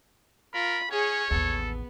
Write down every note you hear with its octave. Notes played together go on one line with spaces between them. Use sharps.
F4 A#4 B5
C#4 G#4 C#5
A1 D#2 B3 A4